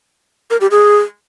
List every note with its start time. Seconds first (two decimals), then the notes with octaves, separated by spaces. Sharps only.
0.50 A#4
0.61 G4
0.71 G#4